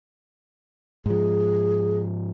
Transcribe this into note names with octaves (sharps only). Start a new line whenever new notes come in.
G#2 F3 G#4